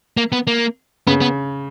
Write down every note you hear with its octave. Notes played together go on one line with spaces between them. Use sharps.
A#3
B3
A#3
C#3 B3
B3